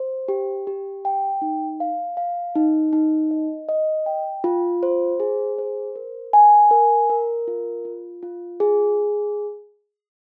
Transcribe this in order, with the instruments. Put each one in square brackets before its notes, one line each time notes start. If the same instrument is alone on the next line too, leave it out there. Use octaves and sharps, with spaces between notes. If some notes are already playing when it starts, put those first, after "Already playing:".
Already playing: [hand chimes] C5
G4
G4
G5
D#4
F5
F5
D#4
D#4
D#5
D#5
G5
F4
C5
G#4
C5
A#4
G#5
A#4
A#4
F4
F4
F4
G#4